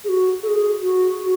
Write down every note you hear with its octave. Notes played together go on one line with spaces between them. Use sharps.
G#4
F#4
A4
G#4
F#4
F#4